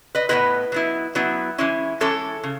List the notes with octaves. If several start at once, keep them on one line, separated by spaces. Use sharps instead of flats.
B4 D#5
A2 G#3 B3 E4 B4 D#5
F#3 B3 E4
F#3 B3 E4
E3 G#3 C#4 E4
E3 G#3 C#4 E4 A4 C#5
C#3